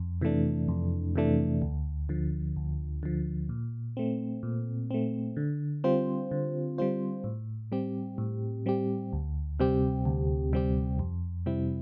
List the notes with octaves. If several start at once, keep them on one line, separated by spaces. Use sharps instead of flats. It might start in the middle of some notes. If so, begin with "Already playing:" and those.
Already playing: F2
C3 E3 A3 D4
F2
C3 E3 A3 D4
D2
D3 F3
D2
D3 F3
A#2
A3 C4
A#2
A3 C4
D3
G3 C4 F4 C5
D3
G3 C4 F4 C5
A2
G3 C4 G4
A2
G3 C4 G4
D2
C3 G3 C4 G4
D2
C3 G3 C4 G4
F2
C3 G3 C4 E4